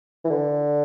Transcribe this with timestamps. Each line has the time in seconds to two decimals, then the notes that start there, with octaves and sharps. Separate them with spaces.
0.25 E3
0.30 D3